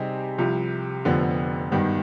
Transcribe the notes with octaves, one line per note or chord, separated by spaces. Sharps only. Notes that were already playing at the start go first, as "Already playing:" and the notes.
Already playing: C3 G3 C4 D#4 G#4
C2 C3 F3
F1 F2 D3 F3 B3
G#1 G2 D#3 B3